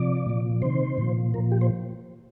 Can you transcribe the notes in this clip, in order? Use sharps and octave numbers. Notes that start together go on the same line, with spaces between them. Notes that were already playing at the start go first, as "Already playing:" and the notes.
Already playing: C3 F3 D5
A#2 F3
C3 D#3 C5
A#2 F3
A#2 F3 A#4
G4
C5